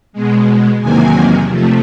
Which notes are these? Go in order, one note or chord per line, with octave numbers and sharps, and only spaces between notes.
B2 G#3
E2 C3 D#3 F#3 A#3 G#5
C3 F3 A3